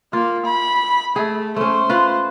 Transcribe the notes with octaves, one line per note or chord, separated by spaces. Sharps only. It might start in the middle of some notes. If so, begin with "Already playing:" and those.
A#3 F4
B5
A3 G#4
A3 C#4 C5
F4 B4 F5